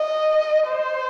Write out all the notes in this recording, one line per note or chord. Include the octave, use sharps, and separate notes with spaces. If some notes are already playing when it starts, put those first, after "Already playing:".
Already playing: D#5
C5